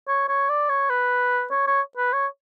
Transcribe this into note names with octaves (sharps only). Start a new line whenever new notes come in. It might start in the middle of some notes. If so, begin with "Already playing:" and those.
C#5
C#5
D5
C#5
B4
C#5
C#5
B4
C#5